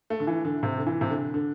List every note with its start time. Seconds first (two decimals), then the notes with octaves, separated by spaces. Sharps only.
0.10 A3
0.20 D3
0.27 E3
0.45 D3
0.63 C3
0.78 D3
0.87 E3
1.01 C3
1.10 D3
1.34 D3